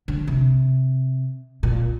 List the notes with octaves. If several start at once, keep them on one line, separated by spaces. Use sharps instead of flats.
D3
C3
A#2